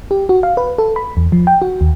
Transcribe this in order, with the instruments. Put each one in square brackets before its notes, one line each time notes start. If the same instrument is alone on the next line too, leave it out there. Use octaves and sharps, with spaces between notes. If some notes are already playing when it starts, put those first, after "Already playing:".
[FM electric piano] G4
F#4
F5
B4
A4
B5
E2
F3
G5
F#4
D#2